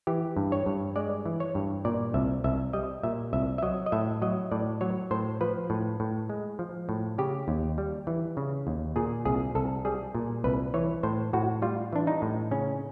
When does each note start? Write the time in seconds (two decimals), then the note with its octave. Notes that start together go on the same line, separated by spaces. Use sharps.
0.07 E3 G4
0.37 G2
0.52 C#5
0.66 G2
0.96 G#3 D5
1.26 E3
1.40 C#5
1.55 G2
1.85 A#2 D5
2.14 C2 E5
2.44 C2 E5
2.73 G3 D#5
3.03 A#2 E5
3.33 C2 E5
3.58 E5
3.63 F#3 D#5
3.86 D#5
3.92 A2 E5
4.22 F#3 D#5
4.51 A2 D5
4.81 F#3 C#5
5.11 A2 C5
5.41 F3 B4
5.70 A2
6.00 A2
6.30 G#3
6.59 F3
6.89 A2
7.18 C#3 G4
7.48 D#2
7.78 G3
8.07 E3
8.37 C#3
8.67 D#2
8.96 A#2 G#4
9.25 C2 G#4
9.55 C2 A4
9.85 G3 G#4
10.15 A#2
10.44 C2 B4
10.74 E3 C#5
11.03 A2 C5
11.33 A2 F#4
11.62 G3 F4
11.93 E3 D4
12.07 D#4
12.22 A2
12.51 C#3 C#4